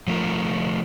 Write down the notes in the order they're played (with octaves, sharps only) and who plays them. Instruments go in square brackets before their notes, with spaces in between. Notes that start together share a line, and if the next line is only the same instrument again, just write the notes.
[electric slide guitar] F3 A3 F4 A#4